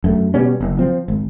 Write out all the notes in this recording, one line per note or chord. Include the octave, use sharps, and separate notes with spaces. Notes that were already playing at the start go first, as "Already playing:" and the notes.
F#2 A3
B2 G3 B3 C#4
F#1
F3 C4
G#1